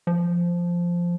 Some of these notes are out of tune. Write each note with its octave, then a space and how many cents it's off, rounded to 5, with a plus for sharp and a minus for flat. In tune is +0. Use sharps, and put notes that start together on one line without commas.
F3 -5